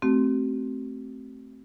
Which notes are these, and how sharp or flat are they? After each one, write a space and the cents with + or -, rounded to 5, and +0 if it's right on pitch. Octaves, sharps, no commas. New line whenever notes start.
A3 +0 C4 +0 F#4 +45